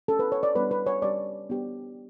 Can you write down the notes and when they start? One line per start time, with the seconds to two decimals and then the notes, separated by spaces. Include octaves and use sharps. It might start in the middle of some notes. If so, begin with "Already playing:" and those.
0.08 C#4 G4 A4
0.19 B4
0.32 C#5
0.43 D5
0.55 G3 B3 D4 B4
0.71 B4
0.86 C#5
1.02 G3 C#4 G4 D5
1.49 B3 D4 G4